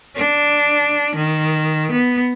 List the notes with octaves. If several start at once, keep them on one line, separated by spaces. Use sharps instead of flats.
D4
D#3
B3